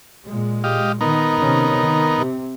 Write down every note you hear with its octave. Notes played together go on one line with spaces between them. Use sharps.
A#2 G#3
G4 D#5 F5
D#3 B3 D#4 A#4
C3 D#3 C#4
D#3
C3